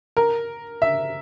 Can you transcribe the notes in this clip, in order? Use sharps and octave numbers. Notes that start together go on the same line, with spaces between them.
A#4
E5